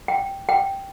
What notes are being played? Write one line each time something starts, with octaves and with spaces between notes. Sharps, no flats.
G5
G5